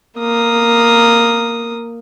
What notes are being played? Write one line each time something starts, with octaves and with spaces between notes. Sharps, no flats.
A#3 D#6